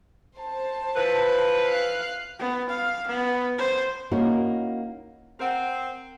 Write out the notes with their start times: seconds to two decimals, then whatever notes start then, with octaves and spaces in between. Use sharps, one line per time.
0.36 C5 A5
0.96 E3 F3 B4
1.63 F5 F#6
2.39 B3
2.70 F5
3.07 B3
3.58 C5
4.11 A#3 C#4 D#4 E4 F#4 A#4
5.39 C4 A#4 F#5